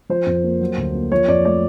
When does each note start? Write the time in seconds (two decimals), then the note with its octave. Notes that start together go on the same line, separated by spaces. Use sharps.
0.09 F3 C5
0.26 F2
0.43 A#3
0.60 F#3
0.78 D2
0.94 A#3
1.12 F3 C#5
1.28 F2 D5
1.45 A3 D5